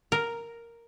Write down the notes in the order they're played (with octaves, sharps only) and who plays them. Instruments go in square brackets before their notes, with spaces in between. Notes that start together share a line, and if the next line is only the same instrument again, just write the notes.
[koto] A#4